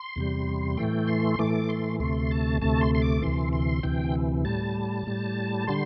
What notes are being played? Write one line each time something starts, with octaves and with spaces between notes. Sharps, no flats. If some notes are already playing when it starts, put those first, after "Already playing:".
Already playing: C6
E2 C3 G3
A2 E3 A3 G5
C6
A2 E3 A3 D6
C6
D2 C3 A3 C6
A5
D2 C3 A3 A5
C6
C6
D6
D2 C3 E3 C6
C6
D2 C3 E3 G5
A2 G3 A5
A2 G3
D3 G3 C6